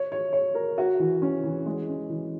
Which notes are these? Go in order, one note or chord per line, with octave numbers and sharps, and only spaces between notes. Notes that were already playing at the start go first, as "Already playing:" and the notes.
Already playing: C#5
C#5
C#5
A#4
F#4
E3
C#4
E3
G#3
C#4
E3